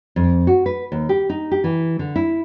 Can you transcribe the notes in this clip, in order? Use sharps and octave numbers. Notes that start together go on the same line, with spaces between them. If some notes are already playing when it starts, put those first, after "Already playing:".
F2
F#4
B4
D#2
G4
D#4
G4
E3
D3
E4